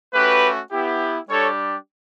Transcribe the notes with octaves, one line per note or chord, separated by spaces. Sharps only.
A3 C#4 F#4 G4 B4
B3 E4 G4
G3 D4 G4 A4 C#5